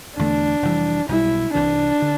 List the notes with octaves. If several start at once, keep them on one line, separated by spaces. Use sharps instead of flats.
E1 E2 D3 A3 D4
F1 F2 E3 G3
B1 B2 G3 E4
C2 C3 E3 D4
D3